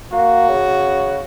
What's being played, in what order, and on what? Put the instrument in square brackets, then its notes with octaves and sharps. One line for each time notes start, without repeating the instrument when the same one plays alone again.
[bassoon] A#3 [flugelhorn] F#4
[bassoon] C#3